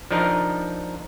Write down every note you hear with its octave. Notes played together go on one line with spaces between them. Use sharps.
F3 D4 D#4 A#4